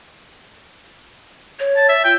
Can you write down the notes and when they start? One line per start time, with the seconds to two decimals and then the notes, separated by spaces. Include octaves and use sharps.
1.59 C#5
1.76 A5
1.89 E5
2.04 F4 G5